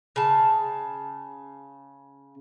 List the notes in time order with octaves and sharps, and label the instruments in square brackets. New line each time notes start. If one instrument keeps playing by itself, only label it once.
[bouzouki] C#3 A5